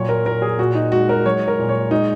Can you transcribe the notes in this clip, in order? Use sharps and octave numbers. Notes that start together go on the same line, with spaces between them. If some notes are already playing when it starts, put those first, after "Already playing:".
Already playing: A#2 F#3 C#5
A#4
A#2 A#4
G#4
A#2 F#4
D#4
G#3 F#4
A#4
F#3 C#5
A#4
A#2
C#5
G#3 D#4